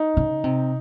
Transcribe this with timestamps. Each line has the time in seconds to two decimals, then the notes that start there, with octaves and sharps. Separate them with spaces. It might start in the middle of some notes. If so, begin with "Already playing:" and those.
Already playing: D#4
0.17 C#3
0.44 C3